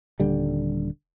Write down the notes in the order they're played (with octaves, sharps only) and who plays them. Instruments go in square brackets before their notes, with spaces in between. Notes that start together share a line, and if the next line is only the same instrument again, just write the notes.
[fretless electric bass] D#1 D3 G3